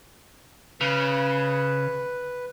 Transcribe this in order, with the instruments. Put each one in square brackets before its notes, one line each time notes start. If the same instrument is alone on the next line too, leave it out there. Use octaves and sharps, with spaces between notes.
[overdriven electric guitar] C#3 [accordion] B4